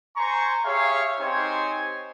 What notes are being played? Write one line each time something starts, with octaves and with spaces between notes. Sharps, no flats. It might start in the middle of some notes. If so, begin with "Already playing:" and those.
C5 G#5 A#5 C#6
G4 G#4 C#5 E5 F5
C4 D#4 G4 C5 C#5 G#5